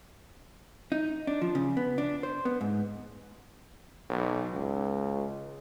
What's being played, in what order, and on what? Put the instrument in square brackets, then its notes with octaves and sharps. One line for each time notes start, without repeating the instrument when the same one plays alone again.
[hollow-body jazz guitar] D#4
D4
F3
C#3
B3
D4
C5
B3
G#2
[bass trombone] B1
C#2